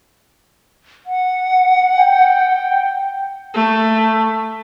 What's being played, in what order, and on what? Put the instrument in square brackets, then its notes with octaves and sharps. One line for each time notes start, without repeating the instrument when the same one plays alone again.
[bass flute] F#5
[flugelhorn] G5
[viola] A3